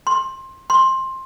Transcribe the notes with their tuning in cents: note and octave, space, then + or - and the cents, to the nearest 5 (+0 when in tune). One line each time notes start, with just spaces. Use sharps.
C6 +20
C6 +15